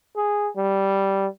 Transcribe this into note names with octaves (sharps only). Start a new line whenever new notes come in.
G#4
G3